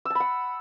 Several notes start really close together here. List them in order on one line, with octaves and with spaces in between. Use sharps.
E6 A5 B5 F#5